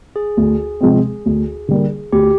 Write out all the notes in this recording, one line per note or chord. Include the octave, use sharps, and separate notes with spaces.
G#4
D2
C3 F3 G#3 C4
D2
D3 G3 A#3
D2 G4